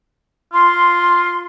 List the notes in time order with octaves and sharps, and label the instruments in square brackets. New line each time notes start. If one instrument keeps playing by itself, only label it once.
[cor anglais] F4 [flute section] C6